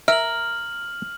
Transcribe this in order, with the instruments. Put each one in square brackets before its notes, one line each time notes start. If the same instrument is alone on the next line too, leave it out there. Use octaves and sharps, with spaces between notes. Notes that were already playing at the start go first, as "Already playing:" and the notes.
[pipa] A#4 [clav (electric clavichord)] E5 [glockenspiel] F6 F#7